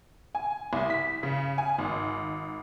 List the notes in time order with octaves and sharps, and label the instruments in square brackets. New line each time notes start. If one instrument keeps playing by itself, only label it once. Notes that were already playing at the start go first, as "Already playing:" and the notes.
[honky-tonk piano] G#5
C2
B6
C#3
G#5
G#1